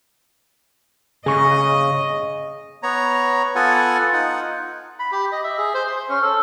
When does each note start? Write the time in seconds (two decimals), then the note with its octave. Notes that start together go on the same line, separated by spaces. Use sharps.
1.26 C#3 G#4 D#5 C#6
2.83 B3 C#5 A#5
3.55 B3 F4 A4 F#5 G#5
4.13 D#4 F4 F#5
4.99 B5
5.12 G4
5.32 D#5
5.44 E5
5.58 G#4
5.74 C5
5.87 C6
6.09 C#4
6.22 A4